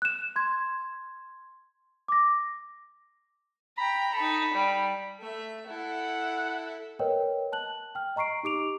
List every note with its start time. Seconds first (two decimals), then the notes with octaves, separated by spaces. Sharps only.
0.02 F#6 E7
0.36 C6 G#6
2.08 D6 A#6
3.78 G5 A#5 B5
4.14 D#4 A4 B5
4.53 G3
5.20 A3 E5
5.67 E4 A4 F#5
6.99 A#4 B4 C#5 D#5 G5
7.52 A5 F#6 F#7
7.95 G5 F6
8.16 D#5 A#5 C#6 C7 D7
8.43 D#4 G4 D6 D7 F7